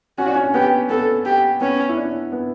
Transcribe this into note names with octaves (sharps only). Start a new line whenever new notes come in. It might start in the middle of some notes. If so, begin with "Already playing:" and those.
C#4 F#4
D4
C#4
B3 G4
B3 A4
G4
B3 C#4
E4
D4
B3